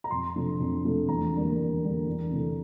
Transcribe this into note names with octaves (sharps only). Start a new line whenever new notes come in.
A#5
F2 C6
C3 F3 A3 D4
F2
C3 F3 A3 D4
E2 A#5
D3 G3 A#3
E2
D3 G3 A#3
E2
C3 E3 A3